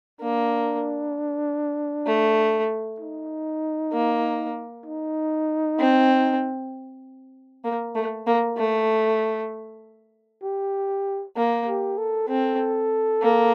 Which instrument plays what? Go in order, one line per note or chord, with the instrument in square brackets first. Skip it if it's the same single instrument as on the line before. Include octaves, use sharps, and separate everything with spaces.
[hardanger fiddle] A#3 [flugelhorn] D4
[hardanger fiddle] A3
[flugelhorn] D#4
[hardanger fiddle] A#3
[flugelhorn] D#4
[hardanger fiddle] C4
A#3
A3
A#3
A3
[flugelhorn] G4
[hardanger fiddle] A#3
[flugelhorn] G4
A4
[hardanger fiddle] C4 [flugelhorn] A4
[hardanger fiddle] A#3